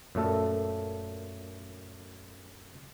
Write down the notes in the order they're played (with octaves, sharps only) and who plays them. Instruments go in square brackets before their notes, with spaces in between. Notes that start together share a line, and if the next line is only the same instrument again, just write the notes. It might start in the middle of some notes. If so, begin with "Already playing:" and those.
[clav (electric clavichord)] F#2 A#2 A3 A4